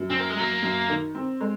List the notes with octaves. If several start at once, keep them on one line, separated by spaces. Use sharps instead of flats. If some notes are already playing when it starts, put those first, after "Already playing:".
Already playing: F#2
C4 C#4
A#3
G#3
F#3 A#3
F#2
D#3
C4
G#3